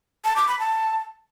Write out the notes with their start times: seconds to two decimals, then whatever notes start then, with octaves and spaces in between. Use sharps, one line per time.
0.25 A5
0.36 D6
0.48 B5
0.59 A5